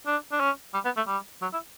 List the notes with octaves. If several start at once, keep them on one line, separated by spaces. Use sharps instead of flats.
D4
D4
C#4
G3
B3
A3
G3
F#3
E4